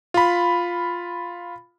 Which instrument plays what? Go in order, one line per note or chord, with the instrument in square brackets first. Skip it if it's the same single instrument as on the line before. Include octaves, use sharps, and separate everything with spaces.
[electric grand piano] F4 B5